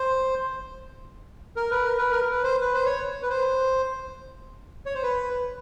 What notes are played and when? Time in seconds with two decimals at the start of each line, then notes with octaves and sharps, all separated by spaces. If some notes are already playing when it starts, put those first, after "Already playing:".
Already playing: C5
1.56 A#4
1.71 B4
1.84 A#4
1.98 B4
2.11 A#4
2.31 B4
2.43 C5
2.61 B4
2.74 C5
2.86 C#5
3.23 B4
3.30 C5
4.86 C#5
4.95 C5
5.03 B4